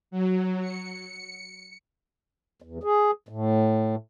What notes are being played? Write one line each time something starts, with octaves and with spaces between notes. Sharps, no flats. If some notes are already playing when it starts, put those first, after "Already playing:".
F#3
C#7
E2
G#4
A2